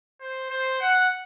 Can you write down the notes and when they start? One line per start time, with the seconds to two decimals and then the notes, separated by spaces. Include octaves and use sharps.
0.21 C5
0.50 C5
0.81 F#5